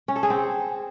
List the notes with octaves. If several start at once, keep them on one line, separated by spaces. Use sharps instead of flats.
C#4
A4
G#4
C4